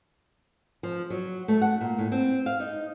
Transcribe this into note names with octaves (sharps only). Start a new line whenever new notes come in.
F3
F#3
A3
F#5
A#2
A2
C4
F5
D#4